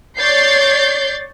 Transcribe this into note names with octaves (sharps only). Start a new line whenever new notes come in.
C#5 D5 G6 A6 C7